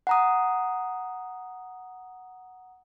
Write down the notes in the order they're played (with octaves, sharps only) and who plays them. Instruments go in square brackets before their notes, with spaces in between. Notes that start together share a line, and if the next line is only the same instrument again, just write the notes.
[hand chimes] F#5 A#5 D#6